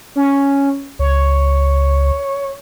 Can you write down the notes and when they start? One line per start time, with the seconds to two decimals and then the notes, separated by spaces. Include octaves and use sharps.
0.16 C#4
0.99 C#2 C#5